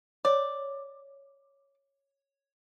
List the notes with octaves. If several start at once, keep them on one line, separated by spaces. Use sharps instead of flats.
C#5 D5